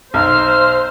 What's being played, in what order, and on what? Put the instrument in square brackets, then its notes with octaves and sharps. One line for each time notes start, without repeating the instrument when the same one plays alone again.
[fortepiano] B1 [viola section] C5 [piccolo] F6